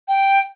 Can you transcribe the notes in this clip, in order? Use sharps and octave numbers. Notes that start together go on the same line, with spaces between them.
G5